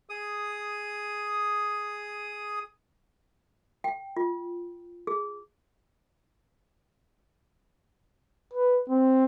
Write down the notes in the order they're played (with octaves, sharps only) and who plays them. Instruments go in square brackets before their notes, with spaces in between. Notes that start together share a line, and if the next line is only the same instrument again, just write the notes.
[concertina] G#4 D#6
[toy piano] G5
F4
G#4
[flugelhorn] B4
C4